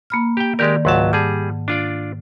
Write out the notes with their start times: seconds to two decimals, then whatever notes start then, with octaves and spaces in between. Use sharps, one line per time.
0.10 A#3 B5 F6
0.37 G4 G5
0.59 D#3 G#3 G4 A#4 D5
0.85 C#2 G#2 F#3 F#5 A5
1.13 G3 G#4 A5
1.68 D4 F4 D5